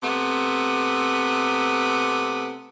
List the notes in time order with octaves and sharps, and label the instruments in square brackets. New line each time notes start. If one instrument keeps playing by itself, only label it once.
[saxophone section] C3 A3 B3